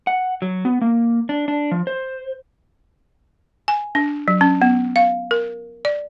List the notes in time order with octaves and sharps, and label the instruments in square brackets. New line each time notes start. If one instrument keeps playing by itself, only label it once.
[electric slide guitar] F#5
F#3
B3
A#3
D4
D4
F3
C5
[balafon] G#5
D4
F#3
C#4
B3
F5
A#4
D5